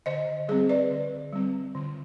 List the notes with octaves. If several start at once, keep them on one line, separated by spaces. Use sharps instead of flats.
D3 C5 D#5
G3 C4 G#4 C5
B4 D5
D3
G3 C4
D3